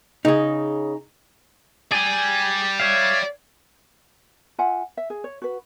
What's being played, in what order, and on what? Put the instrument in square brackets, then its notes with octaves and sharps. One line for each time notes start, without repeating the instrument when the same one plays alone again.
[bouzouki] C#3 [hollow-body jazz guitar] D#4 G#4
[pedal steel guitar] G#4 G#5 [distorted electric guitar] D5 G5
[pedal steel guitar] C#5 E5 F5
[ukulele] F4 E5 F#5 G#5
E5
G#4
C#5
F#4 B4